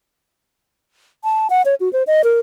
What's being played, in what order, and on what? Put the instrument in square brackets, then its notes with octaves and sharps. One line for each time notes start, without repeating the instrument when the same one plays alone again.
[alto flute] A5
F#5
C#5
F#4
C5
D#5
A#4